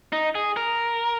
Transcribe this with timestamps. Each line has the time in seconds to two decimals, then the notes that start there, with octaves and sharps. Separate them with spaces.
0.13 D#4
0.35 G#4
0.57 A#4